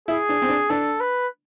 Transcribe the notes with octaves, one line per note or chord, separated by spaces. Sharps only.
E4 G#4
D4
C4
D4
D4 A4
B4